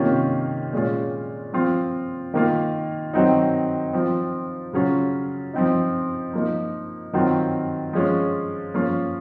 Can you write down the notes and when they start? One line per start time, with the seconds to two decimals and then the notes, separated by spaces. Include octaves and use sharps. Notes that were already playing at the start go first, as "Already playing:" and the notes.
Already playing: C3 D#3 A#3 C#4 F4
0.73 A#2 G#3 C#4 F4
1.53 F3 C4 F4
2.34 D#3 A#3 F4
3.14 D#3 F#3 C4 D#4
3.93 F3 C4 F4
4.73 C#3 F#3 C#4 F4
5.54 F3 C4 D#4
6.34 F3 A#3 D#4
7.13 D#3 F#3 C4 F4
7.93 F3 G#3 C#4 F4
8.74 F3 A#3 C#4 F4